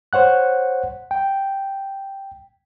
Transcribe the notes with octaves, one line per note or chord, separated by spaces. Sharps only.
C5 C#5 F#5 F#6
G5